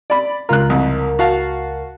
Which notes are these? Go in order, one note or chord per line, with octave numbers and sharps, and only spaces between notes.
D5 B5
C#2 F4 A#4 F#6
C2 F2
F#4 F5 A5